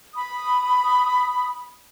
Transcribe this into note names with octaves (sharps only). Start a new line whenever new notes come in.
B5 D#6